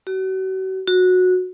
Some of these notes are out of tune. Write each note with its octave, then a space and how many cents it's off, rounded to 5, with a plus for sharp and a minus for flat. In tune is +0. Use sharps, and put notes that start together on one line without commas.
F#4 +40
F#4 -15